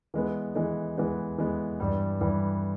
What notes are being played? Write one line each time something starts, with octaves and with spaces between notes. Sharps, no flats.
E3 G#3 B3
E3 G#3 B3
E3 G#3 B3
E3 G#3 B3
G2 E3 G3
G2 E3 G3